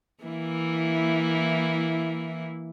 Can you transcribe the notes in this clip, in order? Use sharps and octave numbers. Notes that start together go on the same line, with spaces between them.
E3 A#3 E4